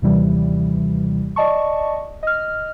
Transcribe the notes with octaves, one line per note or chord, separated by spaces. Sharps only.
D#2 C3 E3 G3
D5 D#5 A5 C#6
D#5 F6